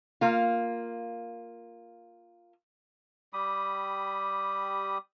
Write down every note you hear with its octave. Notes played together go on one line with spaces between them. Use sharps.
A#3 F4
G3 G4 B5 D#6